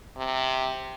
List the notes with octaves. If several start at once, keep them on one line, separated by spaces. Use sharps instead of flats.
C3